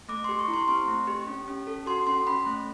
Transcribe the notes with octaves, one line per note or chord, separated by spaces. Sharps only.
A3 D6
C6
G4
C#6
E4
C6
C4 C6
A3
G4
C#4
C#4
A4
F#4 C6
C#4 C6
C#4 B5
A3